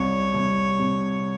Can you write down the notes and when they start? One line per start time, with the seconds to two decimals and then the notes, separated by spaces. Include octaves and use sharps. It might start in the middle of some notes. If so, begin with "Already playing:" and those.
Already playing: C2 C3 C#5
0.34 C2
0.79 C3